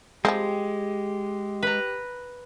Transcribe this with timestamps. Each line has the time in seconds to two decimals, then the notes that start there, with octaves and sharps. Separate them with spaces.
0.25 F3 G3 G#3 C4 G4
1.63 B4 A#5